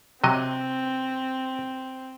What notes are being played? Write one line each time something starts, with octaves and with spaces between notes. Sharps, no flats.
C3 F#3 C4 D#5